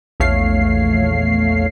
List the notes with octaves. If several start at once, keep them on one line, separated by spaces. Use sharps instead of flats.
A#1 E2 A3 C#5 F5 C7